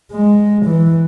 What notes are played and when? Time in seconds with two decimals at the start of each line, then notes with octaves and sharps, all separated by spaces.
0.12 G#3
0.65 E3